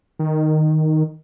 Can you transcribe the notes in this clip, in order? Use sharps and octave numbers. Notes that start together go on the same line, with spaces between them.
D#3